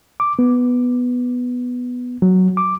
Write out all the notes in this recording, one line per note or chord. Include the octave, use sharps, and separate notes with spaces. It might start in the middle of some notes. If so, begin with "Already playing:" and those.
D6
B3
F#3
D6